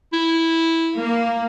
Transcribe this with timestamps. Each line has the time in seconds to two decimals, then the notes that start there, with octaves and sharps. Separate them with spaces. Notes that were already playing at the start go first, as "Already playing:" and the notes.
0.13 E4
0.96 A#3